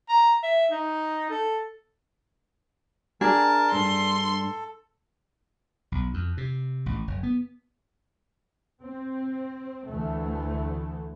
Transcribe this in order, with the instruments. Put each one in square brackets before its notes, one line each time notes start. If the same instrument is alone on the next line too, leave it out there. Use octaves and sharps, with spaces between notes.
[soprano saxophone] A#5
E5
D#4
A4
[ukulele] D4 G#4 [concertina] A#4 A5
[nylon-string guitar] G2 G3 [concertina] A4 [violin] C6
[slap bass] B1
F2
C3
A1
F#1
B3
[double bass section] C4
D2 E3 A3